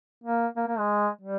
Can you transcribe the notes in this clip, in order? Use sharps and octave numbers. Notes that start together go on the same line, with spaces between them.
A#3
A#3
A#3
G#3
G3